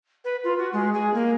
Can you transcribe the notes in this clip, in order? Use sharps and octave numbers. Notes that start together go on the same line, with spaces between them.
B4
F4
F#4
G#3
G#4
A#3